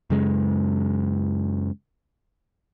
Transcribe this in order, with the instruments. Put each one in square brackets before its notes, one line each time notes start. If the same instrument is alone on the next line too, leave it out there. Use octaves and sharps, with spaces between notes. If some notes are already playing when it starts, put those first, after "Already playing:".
[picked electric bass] F#2 C#3 G#3